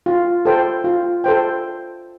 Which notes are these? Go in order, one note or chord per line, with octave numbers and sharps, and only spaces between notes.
F4
A4 C5 G5
F4
A4 C5 G5